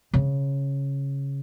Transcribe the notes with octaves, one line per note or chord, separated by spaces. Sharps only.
C#3